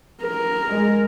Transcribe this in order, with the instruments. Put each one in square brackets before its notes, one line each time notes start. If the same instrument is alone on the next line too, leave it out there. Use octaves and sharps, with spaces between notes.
[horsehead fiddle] A#4
[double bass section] G#3